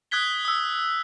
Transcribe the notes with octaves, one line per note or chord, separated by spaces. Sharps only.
D#6 F#6 G#6 B6 G7
D#6 E6